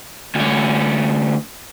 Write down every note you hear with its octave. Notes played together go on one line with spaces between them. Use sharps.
D2 C#4